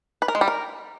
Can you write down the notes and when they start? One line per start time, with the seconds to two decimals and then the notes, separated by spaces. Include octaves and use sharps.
0.22 B4
0.28 A#4
0.35 G#3
0.41 G3
0.48 A#4